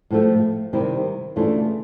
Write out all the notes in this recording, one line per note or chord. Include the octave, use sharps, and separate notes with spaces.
A2 F3 A3
C3 D#3 G3 C4 E4
C#3 E3 A3 D4 F4